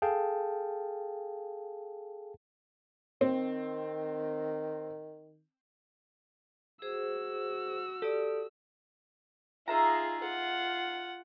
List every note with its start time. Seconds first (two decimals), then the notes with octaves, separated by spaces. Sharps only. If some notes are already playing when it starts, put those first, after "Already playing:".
0.02 G#4 A4 F5 G5 A5
3.21 D#3 C4
6.82 F#4 G#4 C5 E6
8.02 G4 A4 D5
9.68 D#4 F4 G#4 E5 A#5
10.20 F4 F#5